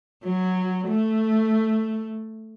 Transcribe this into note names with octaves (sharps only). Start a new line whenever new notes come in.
F#3
A3